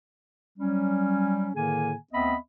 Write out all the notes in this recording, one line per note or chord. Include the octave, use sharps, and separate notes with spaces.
F#3 G3 C#4
A2 D3 D#3 A#3 G#4 G#5
D2 B3 C4 D#5 E5 B5